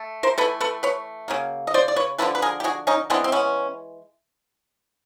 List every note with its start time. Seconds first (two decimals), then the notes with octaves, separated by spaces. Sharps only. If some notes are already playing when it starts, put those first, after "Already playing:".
Already playing: A3
0.23 A#4 C5
0.38 E3 A3 A4 B4
0.61 A4 B4
0.83 B4 C#5
1.28 C#3 F#3 A#3
1.67 D#5
1.74 C5 D5
1.88 D5
1.96 B4 C#5
2.18 D3 F3 A#3 A4 B4
2.35 B4
2.42 G#4 A#4
2.60 G4
2.64 F#4 G#4
2.87 C#4 D#4
3.10 E3 G#3 B3 C4 D4
3.24 C4
3.32 B3 C#4